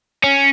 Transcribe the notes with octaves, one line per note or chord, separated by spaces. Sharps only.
C#4